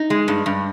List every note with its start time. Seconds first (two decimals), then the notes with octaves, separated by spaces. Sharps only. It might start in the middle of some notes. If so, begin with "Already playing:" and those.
Already playing: D#4
0.10 G#3
0.28 G2
0.46 G2